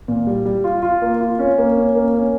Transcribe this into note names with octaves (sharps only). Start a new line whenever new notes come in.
A#2
G3
G3
F4
F4
A#3
F4
C#4
A#3
C#4
A#3
C#4